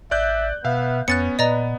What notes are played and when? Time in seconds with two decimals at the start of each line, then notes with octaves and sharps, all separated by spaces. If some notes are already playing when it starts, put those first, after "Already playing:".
0.11 A1 D5 E5 F#6 G6
0.64 B2 B3 E5 F5
1.08 F2 B3 C#4 F#6 A6 C#7
1.39 A#2 B4 D5 D#5 A#5